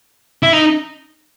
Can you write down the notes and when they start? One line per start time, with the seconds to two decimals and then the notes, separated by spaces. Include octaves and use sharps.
0.43 E4
0.53 D#4